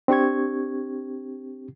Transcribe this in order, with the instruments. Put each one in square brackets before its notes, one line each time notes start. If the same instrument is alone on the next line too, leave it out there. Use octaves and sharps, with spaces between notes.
[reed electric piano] C4 D4 G4 C#6 G#6